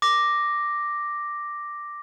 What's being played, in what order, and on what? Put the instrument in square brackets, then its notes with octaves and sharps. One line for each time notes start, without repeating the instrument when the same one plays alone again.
[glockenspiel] D6 A#6